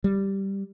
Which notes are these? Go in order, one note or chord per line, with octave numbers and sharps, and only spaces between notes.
G3